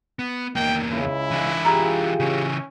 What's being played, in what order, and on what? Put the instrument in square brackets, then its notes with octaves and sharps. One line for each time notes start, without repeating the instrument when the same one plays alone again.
[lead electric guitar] B3
[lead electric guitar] E2 A#3 [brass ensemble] D#3 [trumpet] G5
[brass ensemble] C#2 C#3 [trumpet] E4
[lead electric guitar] E3 D4
[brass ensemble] F4 G4 G#4 [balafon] A#5
[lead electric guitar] C#3 E3 [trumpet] C#4